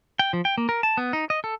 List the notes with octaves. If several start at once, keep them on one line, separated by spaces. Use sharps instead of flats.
G5
F3
G5
A#3
A#4
A5
B3
D#4
D#5
A4